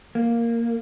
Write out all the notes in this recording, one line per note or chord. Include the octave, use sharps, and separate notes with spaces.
A#3